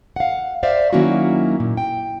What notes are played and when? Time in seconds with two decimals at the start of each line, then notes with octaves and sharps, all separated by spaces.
0.16 F5 F#5
0.63 C5 D5 E5 F5
0.93 D#3 F#3 A#3 C#4 E4 F#4
1.60 A#2
1.77 G5